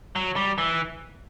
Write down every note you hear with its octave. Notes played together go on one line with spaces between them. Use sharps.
F#3
G3
E3